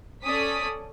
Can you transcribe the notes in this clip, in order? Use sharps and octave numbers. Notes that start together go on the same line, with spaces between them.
C#4 A4 D5 D#6 B6